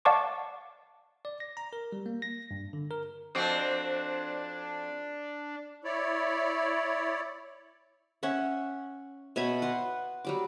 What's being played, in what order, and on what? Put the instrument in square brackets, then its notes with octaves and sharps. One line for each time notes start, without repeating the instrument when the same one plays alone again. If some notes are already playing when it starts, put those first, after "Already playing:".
[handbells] D5 F5 F#5 A5 C#6 D6
[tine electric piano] D5
A#6
A#5
A#4
G3
A#3
A#6
G2
D3
A#4
[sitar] F2 C4 F#4 [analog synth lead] D4
[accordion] E4 C#5 D5
[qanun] C#4 C#5 E5 F#5
B2 C#5 E5 B5
B4 F#5 C6
F#3 G3 D6